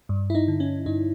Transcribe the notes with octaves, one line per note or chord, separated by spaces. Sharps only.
G2
E4
D#4
D3
C#4
G2 D#4